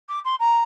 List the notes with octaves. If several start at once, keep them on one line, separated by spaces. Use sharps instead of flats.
D6
C6
A#5